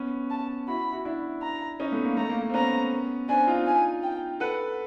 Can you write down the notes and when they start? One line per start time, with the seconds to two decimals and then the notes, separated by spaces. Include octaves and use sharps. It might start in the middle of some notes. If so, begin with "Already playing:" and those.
Already playing: B3 C#4
0.30 A5
0.67 E4 F#4 B5
0.92 E4 F#4
1.05 D4 E4
1.42 A#5
1.80 C#4 D#4
1.92 A3 B3
2.04 A#3
2.17 A3 A#5
2.29 A#3
2.41 A#3
2.50 C4
2.54 B3 C#4 A#5
3.28 C4 D4 G#5
3.47 D#4 F4
3.66 G#5
4.03 G5
4.40 A4 B4 F#5